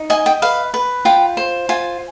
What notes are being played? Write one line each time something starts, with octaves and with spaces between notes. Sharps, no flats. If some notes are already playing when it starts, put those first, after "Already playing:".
Already playing: D#4
D#5 G#5
G5
B4 F5
B4
F4 G5
C5
F4 G#5